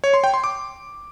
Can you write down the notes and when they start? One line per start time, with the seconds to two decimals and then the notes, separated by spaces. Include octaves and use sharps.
0.04 C#5
0.14 C6
0.24 G5
0.34 C6
0.44 D6